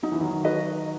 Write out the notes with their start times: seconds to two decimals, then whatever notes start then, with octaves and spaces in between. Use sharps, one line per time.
0.03 F#3 D#4
0.12 E3
0.21 D#3 F#3
0.44 F#4 B4 D#5